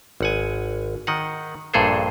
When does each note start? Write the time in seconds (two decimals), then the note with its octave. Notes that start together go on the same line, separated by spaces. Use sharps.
0.21 G#1 F#5 G#5
1.07 D#3 D#5 F#5
1.74 A#1 G2 A#2 G#4 A4 C5